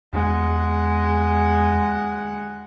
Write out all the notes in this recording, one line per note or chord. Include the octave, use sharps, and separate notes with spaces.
E2 G#3 F#5